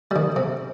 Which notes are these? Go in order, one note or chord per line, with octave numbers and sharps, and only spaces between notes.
D#3 G3
C3